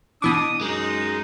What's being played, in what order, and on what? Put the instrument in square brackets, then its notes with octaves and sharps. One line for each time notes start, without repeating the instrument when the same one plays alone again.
[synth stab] B2 E3 D6 [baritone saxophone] D4 [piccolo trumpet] D#6
[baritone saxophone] F#2 [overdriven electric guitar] G#3 [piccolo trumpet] D#4